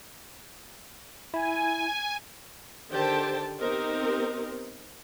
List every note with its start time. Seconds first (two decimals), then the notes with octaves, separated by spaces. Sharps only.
1.34 E4 G#5
2.90 D3 D#3 G4 C5 G5 A5
3.59 B3 C4 D#4 G4 A#4 C5